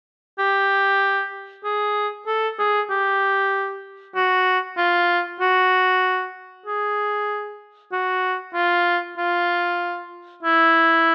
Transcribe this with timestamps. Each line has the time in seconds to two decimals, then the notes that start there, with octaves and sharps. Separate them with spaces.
0.39 G4
1.64 G#4
2.27 A4
2.59 G#4
2.90 G4
4.15 F#4
4.77 F4
5.40 F#4
6.66 G#4
7.92 F#4
8.54 F4
9.17 F4
10.43 E4